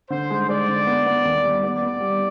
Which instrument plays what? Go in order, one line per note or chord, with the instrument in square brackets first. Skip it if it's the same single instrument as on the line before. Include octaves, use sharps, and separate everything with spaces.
[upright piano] D3 [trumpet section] C5
[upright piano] G#3
[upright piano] G#3 [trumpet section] D5
[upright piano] D3
B3
B3
D#2
G3
[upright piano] B3 [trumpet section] D5
[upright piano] B3
G3